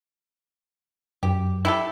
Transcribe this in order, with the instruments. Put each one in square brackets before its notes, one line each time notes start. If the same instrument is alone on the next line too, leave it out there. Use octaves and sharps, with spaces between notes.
[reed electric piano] F#2 [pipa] G4
[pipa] E4 G4 A4